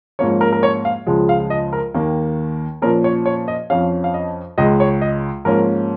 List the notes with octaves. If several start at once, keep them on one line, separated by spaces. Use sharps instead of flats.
G#2 F3 A#3 C#4 C#5
A#4
A#4
C#5
F5
C#2 C#3 F3 G#3
F5
D#5
A#4
D#2 D#3 A#3
A#2 F3 C#4 A#4
C#5
C#5
D#5
F2 F3 C#4 F5
F5
D#5
C#2 C#3 G#3 D#5
C#5
D#5
G#2 F3 A#3 C#4 A#4